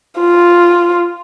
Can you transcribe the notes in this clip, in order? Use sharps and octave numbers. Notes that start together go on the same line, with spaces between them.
F4